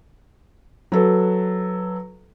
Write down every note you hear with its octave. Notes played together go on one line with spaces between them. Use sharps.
F#3 A4 B4